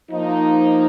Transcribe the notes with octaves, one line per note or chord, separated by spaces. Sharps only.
F3 A#3 D#4